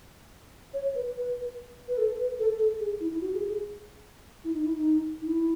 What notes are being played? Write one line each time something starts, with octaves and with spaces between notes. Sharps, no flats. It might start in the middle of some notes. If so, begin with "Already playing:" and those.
C#5
B4
B4
B4
A4
B4
A4
A4
G#4
E4
E4
F#4
G#4
G#4
E4
D#4
E4
D#4
D#4
E4